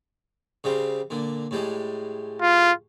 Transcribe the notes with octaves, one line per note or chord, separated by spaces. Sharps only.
C#3 G3 C4
A#2 D3
A2 G3 G#3
F4